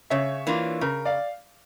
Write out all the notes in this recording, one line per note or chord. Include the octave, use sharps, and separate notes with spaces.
C#3 C#5 E5
E3 A#3 D4 F4
C#3 A#4
D5 F5